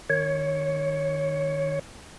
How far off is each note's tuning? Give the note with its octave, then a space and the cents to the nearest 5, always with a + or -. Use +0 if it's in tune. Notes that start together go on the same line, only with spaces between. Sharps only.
D#3 -15 C#5 +0